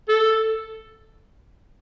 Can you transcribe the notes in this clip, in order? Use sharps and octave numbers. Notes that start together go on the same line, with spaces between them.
A4